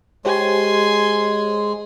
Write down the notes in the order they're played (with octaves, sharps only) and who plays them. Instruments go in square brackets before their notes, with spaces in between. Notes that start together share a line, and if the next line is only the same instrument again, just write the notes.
[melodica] G#3 [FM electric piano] G4 C5 C#5 [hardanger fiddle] G#5 C6